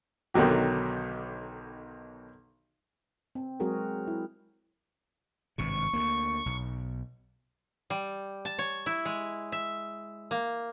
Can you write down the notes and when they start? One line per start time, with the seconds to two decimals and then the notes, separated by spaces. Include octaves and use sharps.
0.34 B1 D3 D#3 F#3 G4
3.35 C4
3.60 F#3 G#3 C4 F#4 G#4 A#4
4.08 E4
5.58 G#1 G2 C3 C#6
5.93 D2 A#3
6.46 B1
7.90 G3
8.45 A5
8.59 C#5
8.86 E4
9.05 G#3
9.52 E5
10.31 A#3